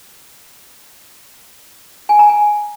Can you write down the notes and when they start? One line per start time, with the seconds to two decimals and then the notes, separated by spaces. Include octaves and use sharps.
2.09 G#5
2.19 A#5
2.29 G#5